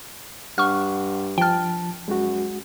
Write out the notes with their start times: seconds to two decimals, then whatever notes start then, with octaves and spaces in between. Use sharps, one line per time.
0.58 G2 F#5 C#6 F6
1.38 F3 G5 A5 F6
2.08 F#2 G#3 F#4